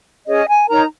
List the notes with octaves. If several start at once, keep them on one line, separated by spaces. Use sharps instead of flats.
C#4 G#4 C#5 D#5
G#5
D#4 A#4 C#5 A#5